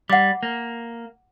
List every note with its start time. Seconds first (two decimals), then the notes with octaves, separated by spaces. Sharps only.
0.10 G3 F#5 D6
0.43 A#3